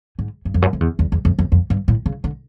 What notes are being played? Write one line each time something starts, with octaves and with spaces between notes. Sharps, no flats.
G#2
G2
F2
F#2
F2
E2
E2
E2
F2
F2
F2
G2
A2
C#3
D3